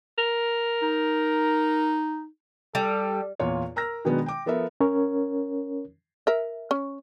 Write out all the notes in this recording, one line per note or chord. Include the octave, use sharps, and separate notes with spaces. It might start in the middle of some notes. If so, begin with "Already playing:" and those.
A#4
D#4
G3 A4
E2 A#2 F4 C#5
A#4 A#5 E6 F6 A#6
B2 D#3 F#3 G#3 B3 D4
G5 D6
F3 B3 A4 A#4 E5
C#4 A#4 C#5
A#4 E5
C#4